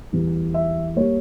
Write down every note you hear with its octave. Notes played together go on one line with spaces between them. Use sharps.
E2 E3 G3
E5
G3 A#3 C#5